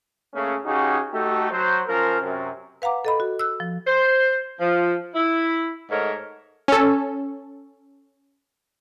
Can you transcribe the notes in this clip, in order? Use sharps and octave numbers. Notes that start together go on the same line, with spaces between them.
C#3 A3 A#3 C#4
C#3 C#4 D#4 F#4 G4
A3 D#4 F#4 G4 A4
F#3 C5
F3 C#4 A#4
F#2 C3
B4 F5 F#5 A#5 D6
A4 D#5 B5
F#4
E6 F#6
F3
C5
F3
E4
G#2 A3 A#4 C#5
C#4 A4